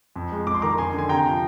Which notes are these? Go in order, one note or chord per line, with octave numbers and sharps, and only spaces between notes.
F2
G#3
F2 D6
C6
D#3 A#5 D6
F2 G#5 C6
D3 G#5
C3 G5 A#5
F3